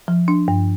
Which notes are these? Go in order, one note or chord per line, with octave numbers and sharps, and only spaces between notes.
F3
D4
G2